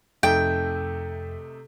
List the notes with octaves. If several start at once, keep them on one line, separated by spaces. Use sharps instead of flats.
F2 C3 A3 D#4 G5